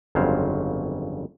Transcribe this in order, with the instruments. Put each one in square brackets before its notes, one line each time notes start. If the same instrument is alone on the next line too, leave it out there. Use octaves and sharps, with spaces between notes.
[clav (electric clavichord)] G1 F2 C#3 F#3 C5 F5